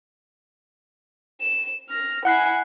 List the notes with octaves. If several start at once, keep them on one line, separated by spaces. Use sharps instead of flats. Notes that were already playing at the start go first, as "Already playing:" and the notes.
E7
F6 A#6
E4 F#5 G#5 F#6 C7